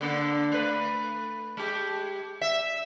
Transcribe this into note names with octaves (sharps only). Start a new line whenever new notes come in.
D3 A#3 D4
A3 B4
G#3 G4
E5